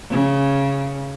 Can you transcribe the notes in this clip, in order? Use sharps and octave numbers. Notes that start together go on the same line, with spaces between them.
C#3